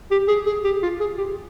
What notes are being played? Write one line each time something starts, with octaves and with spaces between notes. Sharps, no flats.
G4
G#4
G#4
G4
F4
G#4
G4